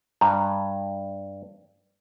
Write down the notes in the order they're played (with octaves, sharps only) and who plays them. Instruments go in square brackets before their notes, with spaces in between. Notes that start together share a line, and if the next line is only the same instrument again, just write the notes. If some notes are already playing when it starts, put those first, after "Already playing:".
[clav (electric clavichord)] G2 [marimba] A#5